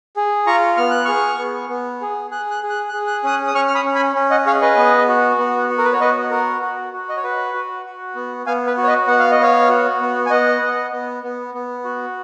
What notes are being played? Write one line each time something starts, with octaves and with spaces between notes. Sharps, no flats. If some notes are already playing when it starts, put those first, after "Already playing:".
G#4
F4 A#5 C#6
B3 F6
F#6
G#4 C#6 F6
B3
B3
G#4
G#4 F#6
F#6
G#4
F#6
G#4 F#6
F#6
C#4 D#6 F#6
D#6
C#4 C#6 F6
F6
B5 D#6
C#4
G#5 B5
C#4
D#5 F#5
G#4 C#5 F5
B4 D#5
B3
F#4
B3
F#4
A#4
B4
C#5
B3 B4 D#5
F#4 A#4
F#4
F#4
D#5
C#5
F#4 B4
F#4
F#4
B3
B3 F5 G#5
B4
F#4
C#5
B4 D#5
B3 F#5
F5
D#5
B3 C#5 F5
F#4
B3
G#5
B3 D#5 F#5
B3
B3
B3
B3
F#4